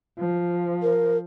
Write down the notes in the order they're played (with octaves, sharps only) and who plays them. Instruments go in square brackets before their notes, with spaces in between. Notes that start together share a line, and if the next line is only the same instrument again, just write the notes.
[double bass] F3
[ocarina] A#4